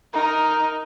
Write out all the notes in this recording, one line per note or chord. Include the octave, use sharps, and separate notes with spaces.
D#4 A#4